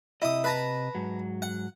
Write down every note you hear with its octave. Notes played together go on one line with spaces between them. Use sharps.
C3 E4 D#5 D#6
B4 A5 A#5
G#2 F#3
F#5